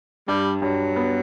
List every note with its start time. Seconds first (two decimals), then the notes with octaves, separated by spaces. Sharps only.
0.28 G2 G3
0.61 G2 F#3
0.96 B3